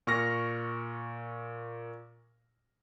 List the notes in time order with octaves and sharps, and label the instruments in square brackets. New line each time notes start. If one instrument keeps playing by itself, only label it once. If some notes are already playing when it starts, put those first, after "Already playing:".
[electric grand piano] A#2 C#6 F6 A#6